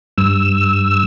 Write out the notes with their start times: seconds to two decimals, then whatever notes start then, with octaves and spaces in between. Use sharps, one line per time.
0.18 G2 E6